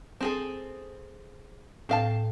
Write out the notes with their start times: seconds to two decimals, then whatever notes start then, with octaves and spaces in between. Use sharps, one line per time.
0.21 C4 G#4 A4
1.89 A2 C4 F5 G5 A5